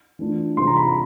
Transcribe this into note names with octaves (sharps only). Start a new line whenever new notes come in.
E3 A3 D4 F4
C3 E3 G3 C4 F4 C6
A#5
B5
A#5